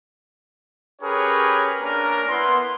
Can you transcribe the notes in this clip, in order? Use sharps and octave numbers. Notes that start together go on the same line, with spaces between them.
C#4 G4 G#4 A#4 B4 C#5
A#3 C#4 D4 A#4
B3 E4 C6